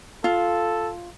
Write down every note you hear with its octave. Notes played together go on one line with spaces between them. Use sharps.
F4 A4